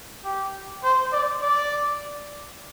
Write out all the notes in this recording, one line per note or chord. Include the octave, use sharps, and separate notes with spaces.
G4
C5
D5
D5